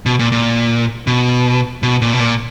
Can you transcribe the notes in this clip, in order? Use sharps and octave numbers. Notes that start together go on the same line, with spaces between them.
B2
A#2
A#2
B2
B2
A#2
B2
A#2